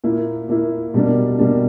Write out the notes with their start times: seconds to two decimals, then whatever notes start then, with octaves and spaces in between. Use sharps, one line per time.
0.04 A#2 A#3 E4
0.49 A#2 A#3 E4
0.94 B2 G3 A#3 D4
1.39 B2 G3 A#3 D4